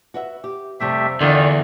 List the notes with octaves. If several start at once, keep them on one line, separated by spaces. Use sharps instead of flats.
F#4 B4 E5
G4
F2 C3 G3 A3 G4 E5
E2 D3 D#3 F4 D5